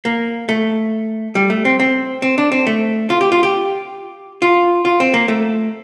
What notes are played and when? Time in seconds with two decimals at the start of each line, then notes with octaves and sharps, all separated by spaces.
0.05 A#3
0.49 A3
1.35 G3
1.50 A3
1.65 C4
1.80 C4
2.22 C4
2.38 D4
2.52 C4
2.67 A3
3.10 F4
3.21 G4
3.32 F4
3.43 G4
4.42 F4
4.85 F4
5.00 C4
5.14 A#3
5.28 A3